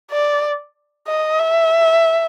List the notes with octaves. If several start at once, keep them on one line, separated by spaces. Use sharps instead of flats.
D5
D#5
E5